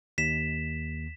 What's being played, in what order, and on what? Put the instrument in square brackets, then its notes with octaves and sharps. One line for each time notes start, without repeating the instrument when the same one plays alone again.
[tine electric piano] D#2 [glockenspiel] B6 E7